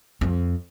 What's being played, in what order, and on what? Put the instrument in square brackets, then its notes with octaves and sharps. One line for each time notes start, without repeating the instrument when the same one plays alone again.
[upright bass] F2